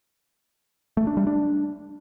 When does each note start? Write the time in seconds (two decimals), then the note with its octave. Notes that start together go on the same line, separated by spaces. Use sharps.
0.97 A3
1.07 D4
1.17 G3
1.27 D4